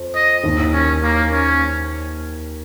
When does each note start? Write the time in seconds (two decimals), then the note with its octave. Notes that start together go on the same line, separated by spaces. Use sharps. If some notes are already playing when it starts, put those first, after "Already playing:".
Already playing: F2
0.15 D#5
0.44 D#2 D#3
0.73 C#4
1.03 A#3
1.31 C#4